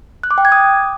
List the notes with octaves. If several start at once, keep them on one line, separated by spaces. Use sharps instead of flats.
F#6
D6
G5
G#6
D#6